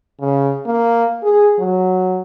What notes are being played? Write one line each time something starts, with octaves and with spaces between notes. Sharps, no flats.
C#3
A#3
G#4
F#3